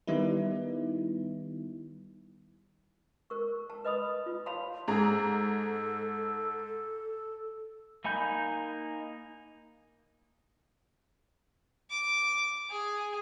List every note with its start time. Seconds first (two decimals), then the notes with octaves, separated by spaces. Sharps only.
0.07 D#3 G3 B3 D#4 E4
3.30 A#4 C#6
3.70 A5
3.84 B4 D#5 B5 D#6
4.26 F4
4.46 C#5 F5 A5 B5 C6
4.88 G#2 G#4 A4 A#5
8.04 A#3 D#4 G#5 B5 G6
11.90 D6
12.70 G#4